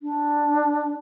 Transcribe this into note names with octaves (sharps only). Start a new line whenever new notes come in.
D4